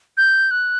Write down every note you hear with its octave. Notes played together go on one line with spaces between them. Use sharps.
G6
F#6